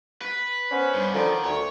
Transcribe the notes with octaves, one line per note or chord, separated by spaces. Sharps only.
B4
B3 C#4 C5
G2
D3 D#3 F3
D2 C#5